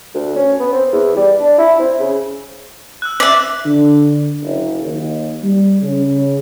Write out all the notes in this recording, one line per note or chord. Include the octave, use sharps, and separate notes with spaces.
D2
C#4
B3
C4
E2
G3
D4
E4
C4
C#3
E6 F#6
D5 E5
D3
F#1
D#2
G3
C#3